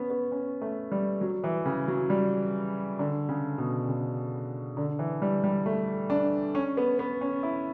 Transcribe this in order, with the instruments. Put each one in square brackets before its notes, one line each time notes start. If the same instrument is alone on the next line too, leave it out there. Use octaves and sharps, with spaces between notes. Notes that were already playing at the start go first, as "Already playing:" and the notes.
Already playing: [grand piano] B3 C#4
B3
C#4
A3
G3
F#3
E3
C#3
F#3
G3
D3
C#3
B2
C#3
D3
E3
G3
G3
A3
D4
C#4
B3
B3
C#4
E4